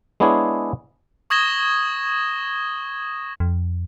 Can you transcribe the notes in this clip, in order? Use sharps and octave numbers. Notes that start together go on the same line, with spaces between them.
G#3 B3 D4 E4 G#4 C#5
C#6 D#6 G#6 A#6 E7 G7
F2